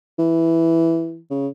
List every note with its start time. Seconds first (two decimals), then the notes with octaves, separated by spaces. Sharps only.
0.19 E3
1.31 C#3